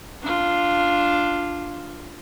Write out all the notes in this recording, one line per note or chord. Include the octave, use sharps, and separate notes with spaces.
D4 F4